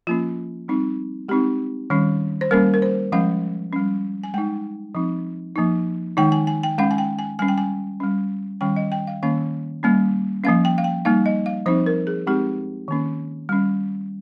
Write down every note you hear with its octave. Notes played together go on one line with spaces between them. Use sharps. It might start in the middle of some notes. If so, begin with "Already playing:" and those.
F3 A#3 C#4 F4
G3 C4 D#4
G#3 C4 D#4 G4
D#3 G3 C#4
C5
G3 A#3 C#4 A#4
A#4
C5
F3 G#3 C#4 F5
G3 C#4
G#5
G#3 D#4 G5
F3 C4 D#4
F3 A#3 D#4
D#3 G#3 D#4 G5
G#5
G#5
G5
G#3 C#4 F5
G#5
G5
G#5
G3 C#4 G#5
G5
G#5
G3 C#4
D#3 G3 C#4 G5
D#5
G5
F5
D#3 A#3 C#4 F5
G3 A#3 C#4
F3 A#3 C#4 F5
G5
F5
G5
G3 A#3 D#4 F5
D#5
F5
F3 C4 D#4 C5
A#4
G#4
G#3 C4 D#4 G4
D#3 A#3 C#4
G3 C#4